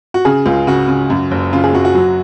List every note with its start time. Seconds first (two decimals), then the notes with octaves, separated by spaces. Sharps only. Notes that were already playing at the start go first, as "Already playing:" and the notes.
0.14 F#4
0.25 C#3 G#4
0.46 C#2 F4
0.67 C#3 F#4
0.88 C#3
1.10 F#2
1.31 F#1
1.53 C#3 F4
1.64 G#4
1.73 F#2 F#4
1.85 F#4
1.95 F#3